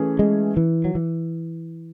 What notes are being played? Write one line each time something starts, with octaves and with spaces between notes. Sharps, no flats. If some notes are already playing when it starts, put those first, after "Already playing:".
Already playing: E3 A3 C#4 G#4
G#3
E3
F#3
E3